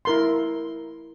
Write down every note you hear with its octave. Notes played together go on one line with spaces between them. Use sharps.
E4 A#4 C6